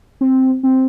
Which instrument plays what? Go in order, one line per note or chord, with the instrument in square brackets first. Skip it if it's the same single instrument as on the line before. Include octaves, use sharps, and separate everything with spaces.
[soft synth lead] C4
C4